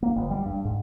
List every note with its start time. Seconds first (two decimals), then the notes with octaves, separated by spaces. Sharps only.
0.03 A#3
0.16 G1
0.31 G3
0.45 G2
0.65 G#2